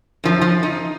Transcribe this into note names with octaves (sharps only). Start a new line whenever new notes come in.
F#2 F3
F3
D#4